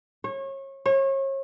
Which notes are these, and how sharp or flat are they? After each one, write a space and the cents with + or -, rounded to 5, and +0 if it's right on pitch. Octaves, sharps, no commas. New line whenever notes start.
C#5 -30
C#5 -35